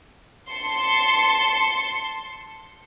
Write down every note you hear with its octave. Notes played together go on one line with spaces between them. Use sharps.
A5 C6 C#7